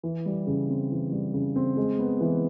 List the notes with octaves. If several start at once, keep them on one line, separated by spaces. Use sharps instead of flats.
E3
G3
C#3
C4
E3
G3
C#3
C4
G#3
B3
E3